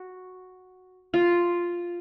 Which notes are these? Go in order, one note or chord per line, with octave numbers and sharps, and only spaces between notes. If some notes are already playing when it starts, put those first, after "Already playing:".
Already playing: F#4
F4